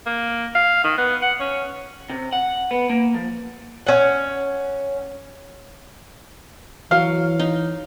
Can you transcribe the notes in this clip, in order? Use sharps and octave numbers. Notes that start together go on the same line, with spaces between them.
A#3
F5
D#3
B3
F#5
C#4
C3
F#5
B3
A#3
F3
C#4 F#5
E3 F#3 F5
D#4